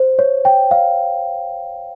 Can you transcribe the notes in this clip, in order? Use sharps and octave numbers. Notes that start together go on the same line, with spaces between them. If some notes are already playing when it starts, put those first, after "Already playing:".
Already playing: C5
C#5
G5
F5